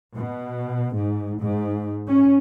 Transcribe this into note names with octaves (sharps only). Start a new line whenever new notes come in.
B2
G#2
G#2
C#4